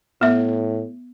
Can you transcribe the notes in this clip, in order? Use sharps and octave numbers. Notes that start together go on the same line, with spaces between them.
A2 B3 E5